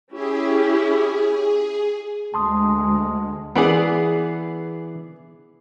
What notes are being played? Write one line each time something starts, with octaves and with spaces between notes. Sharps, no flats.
C#4 E4 G4 G#4
D2 G#3 A5 C6 D#6
E3 B3 G#4 D5 F#5